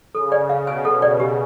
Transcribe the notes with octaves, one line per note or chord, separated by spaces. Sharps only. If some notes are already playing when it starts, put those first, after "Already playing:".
C#3 A4
D5
F5
B2 G#5
A4
D5
G4